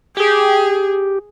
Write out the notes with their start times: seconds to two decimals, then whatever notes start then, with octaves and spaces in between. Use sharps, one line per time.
0.17 G4 G#4